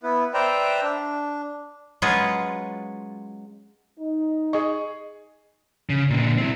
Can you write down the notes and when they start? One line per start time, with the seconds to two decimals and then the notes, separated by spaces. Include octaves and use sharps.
0.03 B3 E4 B4
0.34 B4 C5 D5 E5 G5 A#5
0.83 D4
2.02 F#3 G#3 C#4 F4 G#4 B4
3.99 D#4
4.53 G#4 D#5 C#6
5.90 C#3
6.10 A#2 D3
6.38 C4 E4